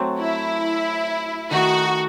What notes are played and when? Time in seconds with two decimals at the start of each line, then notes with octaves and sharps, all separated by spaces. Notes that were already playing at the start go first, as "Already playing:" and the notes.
Already playing: F#3 A3 C4
0.19 E4
1.51 D#3 A3 D#4 F#4